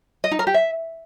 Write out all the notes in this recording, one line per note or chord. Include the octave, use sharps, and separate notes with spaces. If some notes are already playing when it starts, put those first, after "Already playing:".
D#5
D#4
A#4
G4
E5